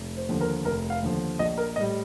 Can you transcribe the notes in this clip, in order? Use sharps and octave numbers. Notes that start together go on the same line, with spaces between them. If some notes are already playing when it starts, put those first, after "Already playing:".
Already playing: F1
C5
D#2 D3 F3
A#4
F1 A#4
F5
D#2 D3 F3
A#1 D#5
A#4
A2 G3 D#5